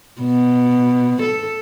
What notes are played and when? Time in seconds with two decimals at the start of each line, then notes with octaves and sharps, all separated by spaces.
0.22 B2
1.22 A4